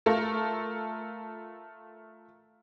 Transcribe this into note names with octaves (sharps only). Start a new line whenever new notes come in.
A3 F4 A4 A#4